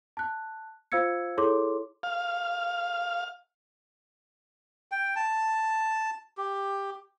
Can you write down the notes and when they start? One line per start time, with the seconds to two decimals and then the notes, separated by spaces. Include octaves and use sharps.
0.17 A5 F#6
0.92 F4 C5 F5 E6 G#6 C#7
1.37 E4 G#4 A4 C#5 C6 D6
2.03 F5
4.92 G5
5.16 A5
6.38 G4